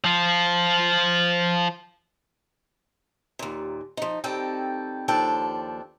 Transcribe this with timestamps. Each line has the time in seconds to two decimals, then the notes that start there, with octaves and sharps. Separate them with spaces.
0.04 F3 F4
3.39 D#2 A#2
3.97 F3 D#4
4.24 D#3 G3 C4 A4 G5
5.08 D#2 F3 D4 A4 G5